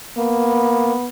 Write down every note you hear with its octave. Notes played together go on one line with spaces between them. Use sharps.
A#3 B3